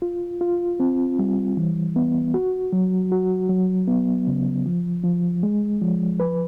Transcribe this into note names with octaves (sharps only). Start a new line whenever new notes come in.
F4
F4
C4
G3
E3
B3
F#4
F#3
F#4
F#3
B3
C#3
F3
F3
G#3
F3
B4